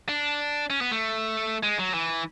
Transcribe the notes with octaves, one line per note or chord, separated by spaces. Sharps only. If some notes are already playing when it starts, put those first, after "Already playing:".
D4
C#4
B3
A3
G#3
F#3
E3